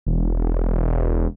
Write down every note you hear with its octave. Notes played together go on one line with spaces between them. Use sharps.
E1